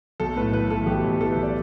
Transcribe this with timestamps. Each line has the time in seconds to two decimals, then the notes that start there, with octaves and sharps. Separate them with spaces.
0.20 B1 A4
0.36 A2 B4
0.53 E3 B4
0.70 E3 A4
0.86 B1 G4
1.04 B1
1.20 E3 A4
1.32 B4
1.37 B1
1.43 D5